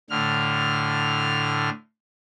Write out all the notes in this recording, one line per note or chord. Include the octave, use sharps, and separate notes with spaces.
A2 D3 F6